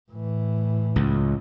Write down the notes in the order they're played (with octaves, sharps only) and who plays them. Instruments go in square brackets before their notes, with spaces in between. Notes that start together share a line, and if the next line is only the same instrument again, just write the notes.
[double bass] A2 E3
[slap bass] C#2